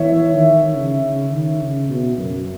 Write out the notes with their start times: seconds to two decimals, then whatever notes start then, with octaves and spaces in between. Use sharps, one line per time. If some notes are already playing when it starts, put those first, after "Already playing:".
Already playing: E3 C#5 E5
0.33 D#3
0.75 C#3
1.03 C#3
1.32 D#3
1.61 C#3
1.90 B2
2.17 F#2